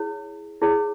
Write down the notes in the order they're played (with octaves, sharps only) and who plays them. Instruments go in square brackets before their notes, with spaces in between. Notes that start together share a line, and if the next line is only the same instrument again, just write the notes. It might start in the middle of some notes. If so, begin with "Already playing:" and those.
Already playing: [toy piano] E4 G#4 C#5
E4 G#4 C#5